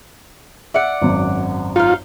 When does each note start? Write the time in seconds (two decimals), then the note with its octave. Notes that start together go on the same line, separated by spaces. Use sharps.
0.74 D5 E5 F#5
1.01 G#1 F#2
1.76 D#4 F4 F5